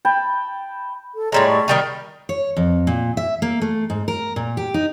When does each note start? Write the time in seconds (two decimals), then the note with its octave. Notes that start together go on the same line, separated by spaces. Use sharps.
0.05 G5 A5 B5
1.16 A4
1.32 A2 G3 G#3 C#5 A#5 C6
1.48 C#6
1.68 D#3 G3 D#4
2.29 C#5
2.57 F2
2.87 A#2
3.17 E5
3.42 A#3
3.61 A3
3.90 G#2
4.08 A#4
4.36 A#2
4.57 G4
4.74 D#4